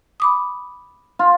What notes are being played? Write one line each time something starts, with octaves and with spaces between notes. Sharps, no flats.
B5 D6 D#6
F4